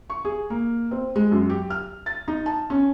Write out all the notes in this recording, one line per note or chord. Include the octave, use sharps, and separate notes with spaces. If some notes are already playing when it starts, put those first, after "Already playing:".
C#6
G#4
A#3
C4
G#3
F#2
G4
F6
A6
D#4
A5
C#4